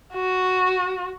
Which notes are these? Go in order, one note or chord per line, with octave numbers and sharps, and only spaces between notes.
F#4